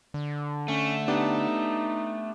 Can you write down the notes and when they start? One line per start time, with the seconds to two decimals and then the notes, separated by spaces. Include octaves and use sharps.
0.14 D3
0.68 A3 C#4
1.08 B3 D4 D#4 G4